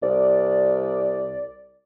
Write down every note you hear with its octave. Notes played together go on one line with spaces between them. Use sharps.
C2 D5